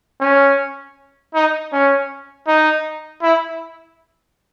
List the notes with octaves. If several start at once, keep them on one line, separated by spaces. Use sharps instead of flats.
C#4
D#4
C#4
D#4
E4